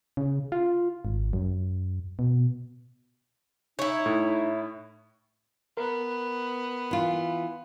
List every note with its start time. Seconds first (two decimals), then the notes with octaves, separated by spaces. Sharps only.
0.17 C#3
0.52 F4
1.05 G#1
1.33 F#2
2.19 B2
3.79 D#4 E4 C#5
4.06 A2
5.77 B3 A#4
6.91 E3 F4